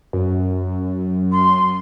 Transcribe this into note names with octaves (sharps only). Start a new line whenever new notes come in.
F#2
C6